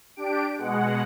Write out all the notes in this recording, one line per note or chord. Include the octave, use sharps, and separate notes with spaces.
D4 G4 D7
B2 G#3 F#5